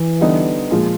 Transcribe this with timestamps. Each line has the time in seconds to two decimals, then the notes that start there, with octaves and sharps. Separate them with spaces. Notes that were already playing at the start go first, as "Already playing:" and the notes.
Already playing: E3
0.21 D3 G3 B3 D#4
0.71 A#2 F3 G#3